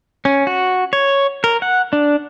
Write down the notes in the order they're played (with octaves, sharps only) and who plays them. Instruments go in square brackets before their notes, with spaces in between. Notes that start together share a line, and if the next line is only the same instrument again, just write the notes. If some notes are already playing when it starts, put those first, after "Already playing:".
[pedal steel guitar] C#4
F#4
C#5
A#4
F#5
D4